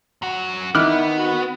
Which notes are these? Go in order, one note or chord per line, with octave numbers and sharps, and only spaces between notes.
F#2 F#4
D#3 B3 E4 D6 F6 F#6
F#4